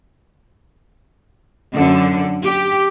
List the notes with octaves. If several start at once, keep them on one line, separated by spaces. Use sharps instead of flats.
F#2 D3
G4